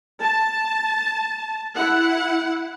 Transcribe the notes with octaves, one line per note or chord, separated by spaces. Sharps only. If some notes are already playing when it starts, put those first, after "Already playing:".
A5
E4 F#5